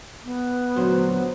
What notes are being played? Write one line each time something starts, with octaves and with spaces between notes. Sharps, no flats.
B3
D2 A#2 F#3 C4